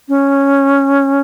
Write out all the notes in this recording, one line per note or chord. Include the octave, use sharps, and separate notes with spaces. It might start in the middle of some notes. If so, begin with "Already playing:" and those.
C#4